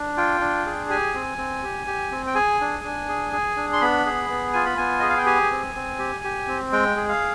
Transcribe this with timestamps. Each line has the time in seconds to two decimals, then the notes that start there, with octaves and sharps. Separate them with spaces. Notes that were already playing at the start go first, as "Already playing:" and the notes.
Already playing: D4
0.17 F4 G5
0.41 D4
0.66 G#4
0.90 G4 G#5
1.14 C4
1.38 C4
1.63 G4
1.87 G4
2.12 C4
2.27 G5
2.35 G#4 G#5
2.60 D4
2.84 D4
3.09 G#4
3.33 G#4
3.57 D4
3.73 C6
3.81 B3 B5
4.06 G#4
4.30 B3
4.53 F4 G#5
4.66 B5
4.77 B3 G#5
5.00 G#4 D#5
5.09 F5
5.17 G5
5.26 G4 G#5
5.52 C4
5.75 C4
5.99 G4
6.24 G4
6.48 C4
6.72 G#3 G5
6.96 G#4
7.09 F5